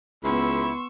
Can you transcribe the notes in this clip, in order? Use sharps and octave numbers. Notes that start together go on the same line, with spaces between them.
C#2 B3 E4 C6 C#6 E6